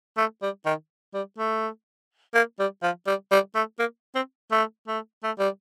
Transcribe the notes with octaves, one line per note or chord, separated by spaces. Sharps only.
A3
G3
D#3
G3
A3
A#3
G3
F3
G3
G3
A3
A#3
C4
A3
A3
A3
G3